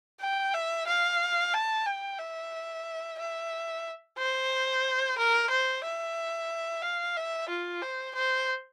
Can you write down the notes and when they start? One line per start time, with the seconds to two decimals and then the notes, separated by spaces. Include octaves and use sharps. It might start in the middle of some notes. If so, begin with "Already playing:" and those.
0.20 G5
0.53 E5
0.87 F5
1.54 A5
1.86 G5
2.19 E5
3.19 E5
4.19 C5
5.18 A#4
5.50 C5
5.84 E5
6.82 F5
7.16 E5
7.49 F4
7.82 C5
8.15 C5